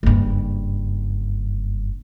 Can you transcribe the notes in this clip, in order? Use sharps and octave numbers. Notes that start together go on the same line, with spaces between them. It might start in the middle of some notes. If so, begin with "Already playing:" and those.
F#1 G2